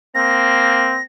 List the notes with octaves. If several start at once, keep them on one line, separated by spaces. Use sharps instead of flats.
A#3 C4 A#6